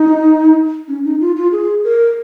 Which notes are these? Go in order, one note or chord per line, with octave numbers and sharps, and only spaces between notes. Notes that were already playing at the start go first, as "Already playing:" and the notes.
Already playing: D#4
C#4
D#4
F4
F4
G#4
A#4